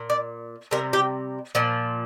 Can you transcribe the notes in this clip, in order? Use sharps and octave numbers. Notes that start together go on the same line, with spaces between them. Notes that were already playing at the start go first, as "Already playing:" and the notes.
Already playing: A#2
D5
C3 G3 A#4
G4
A#2 F3